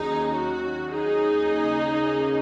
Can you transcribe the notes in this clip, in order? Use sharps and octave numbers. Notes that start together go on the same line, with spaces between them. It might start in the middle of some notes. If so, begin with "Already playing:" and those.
Already playing: D#2 D#3 F#3 C#4 D#4 G#4
F#4
D#4 G#4
D#2 C#3 A#3 C#4